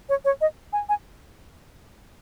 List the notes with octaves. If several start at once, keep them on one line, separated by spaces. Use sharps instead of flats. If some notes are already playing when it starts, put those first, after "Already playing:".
C#5
C#5
D#5
G#5
G#5